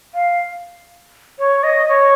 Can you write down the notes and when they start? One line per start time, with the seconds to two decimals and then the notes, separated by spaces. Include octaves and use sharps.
0.14 F5
1.39 C#5
1.63 D#5
1.89 C#5